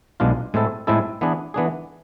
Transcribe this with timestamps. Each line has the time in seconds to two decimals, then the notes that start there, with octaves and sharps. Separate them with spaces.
0.20 B1 B2 G#3 D4 F4
0.54 A2 G#3 C4 E4 A4
0.87 A2 G#3 C4 E4 A4
1.21 E3 B3 D4 G#4
1.54 E3 B3 D4 G#4